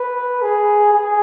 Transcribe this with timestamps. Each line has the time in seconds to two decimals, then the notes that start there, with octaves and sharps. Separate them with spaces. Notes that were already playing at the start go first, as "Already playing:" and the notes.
Already playing: B4
0.42 G#4
0.92 G#4